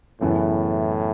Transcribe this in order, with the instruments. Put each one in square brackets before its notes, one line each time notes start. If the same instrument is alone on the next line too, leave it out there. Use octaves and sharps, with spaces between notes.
[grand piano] F#2 C#3 E3 B3 E4 [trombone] A2